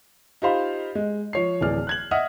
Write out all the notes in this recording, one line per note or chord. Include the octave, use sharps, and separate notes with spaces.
D#4 F4 G4 C5 F5 B5
G#3
F3 C#5 C7
D1 E3 G#4 D5 F6
F#6 G#6 F#7
D#5 E5 F#5 D#6 F6